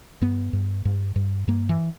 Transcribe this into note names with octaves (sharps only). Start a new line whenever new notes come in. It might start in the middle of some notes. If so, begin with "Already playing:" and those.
G2 B3
G2
G2
G2
G2 A#3
E3